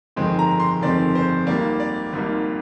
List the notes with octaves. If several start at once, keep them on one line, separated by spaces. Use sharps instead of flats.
G1 F2 D#3 G#3 C4
A#5
C6
G1 F2 D#3 G#3 C4 D5
C5
G#1 G#2 G3 A#3 D5
D5
G#1 G#2 G3 A#3